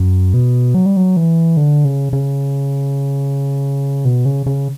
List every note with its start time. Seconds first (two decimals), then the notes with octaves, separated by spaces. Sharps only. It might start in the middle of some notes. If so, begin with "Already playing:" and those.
Already playing: F#2
0.34 B2
0.75 F#3
0.86 G3
0.97 F#3
1.17 E3
1.57 D3
1.85 C#3
2.13 C#3
4.05 B2
4.25 C#3
4.46 C#3